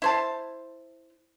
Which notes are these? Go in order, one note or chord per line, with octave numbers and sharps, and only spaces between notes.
E4 C5 A5